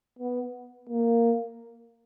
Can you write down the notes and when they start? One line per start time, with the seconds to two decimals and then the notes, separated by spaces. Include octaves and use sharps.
0.19 B3
0.89 A#3